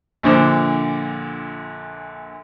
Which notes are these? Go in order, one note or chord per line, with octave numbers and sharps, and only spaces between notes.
A#1 A#2 D3 C5 D6